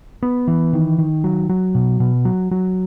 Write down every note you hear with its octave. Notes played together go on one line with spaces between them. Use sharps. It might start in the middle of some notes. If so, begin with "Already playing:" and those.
B3
E3
D#3
D#3
F#3
F#3
B2
B2
F#3
F#3